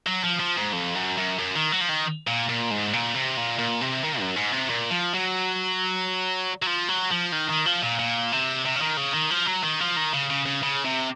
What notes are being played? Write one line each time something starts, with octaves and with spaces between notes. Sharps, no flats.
F#3
F3
F3
G#2
F2
F#2
F#2
F#2
D#3
F#3
F3
D#3
A#2
A#2
G#2
A#2
C3
A#2
A#2
C3
D#3
F#2
G#2
C3
A#2
F3
F#3
F#3
F3
F#3
F3
D#3
D#3
F3
A#2
A#2
C3
C3
C#3
D#3
C#3
D#3
F3
F#3
D#3
F3
D#3
C#3
C#3
C#3
C#3
C3